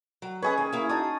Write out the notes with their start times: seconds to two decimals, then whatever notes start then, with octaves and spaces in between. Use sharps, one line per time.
0.22 F#3
0.42 C#4 G#4 B4 C#5 D#5
0.58 D#2
0.72 A#3 E4
0.89 D#4 F#4 A5 D#6